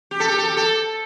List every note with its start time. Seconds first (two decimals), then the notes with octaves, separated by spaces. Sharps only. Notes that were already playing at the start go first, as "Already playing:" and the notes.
0.11 G4
0.20 A4
0.28 G4
0.38 A4
0.48 G4
0.57 A4